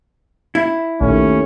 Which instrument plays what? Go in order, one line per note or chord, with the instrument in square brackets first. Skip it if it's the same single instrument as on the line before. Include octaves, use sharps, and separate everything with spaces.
[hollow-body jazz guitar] E4
[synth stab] A#1 [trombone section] D#2 D#3 A3 [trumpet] C#4